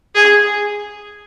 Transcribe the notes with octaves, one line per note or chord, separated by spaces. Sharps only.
G#4